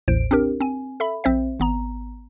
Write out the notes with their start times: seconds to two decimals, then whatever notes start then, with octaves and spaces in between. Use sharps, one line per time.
0.08 A1 D#2 A2 C5 D7
0.31 C4 D4 G4 A#4
0.60 C4 G#5
1.00 A4 E5 B5
1.24 A#1 C4 C5 E5
1.60 G#1 B3 A#5